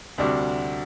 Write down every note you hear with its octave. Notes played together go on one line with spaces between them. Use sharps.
D2 C3 G3 D4 F#4